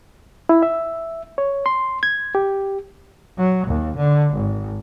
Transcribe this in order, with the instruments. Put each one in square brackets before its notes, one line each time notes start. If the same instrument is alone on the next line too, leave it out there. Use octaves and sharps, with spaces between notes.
[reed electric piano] E4
E5
C#5
C6
G#6
G4
[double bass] F#3
D#2
D3
G#1